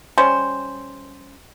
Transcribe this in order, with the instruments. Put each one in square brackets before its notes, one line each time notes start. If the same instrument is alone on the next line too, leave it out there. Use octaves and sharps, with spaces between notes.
[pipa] G3 C#4 C5